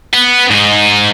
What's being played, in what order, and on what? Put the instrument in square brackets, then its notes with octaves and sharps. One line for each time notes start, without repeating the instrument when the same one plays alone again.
[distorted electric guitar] B3
G#2 D#4